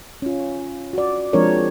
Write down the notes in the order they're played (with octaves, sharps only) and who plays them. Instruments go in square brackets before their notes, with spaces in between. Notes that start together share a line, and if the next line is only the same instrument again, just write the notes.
[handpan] C#4 F4
F#4 D5
F3 G#3 C4 D4 A#4 C#5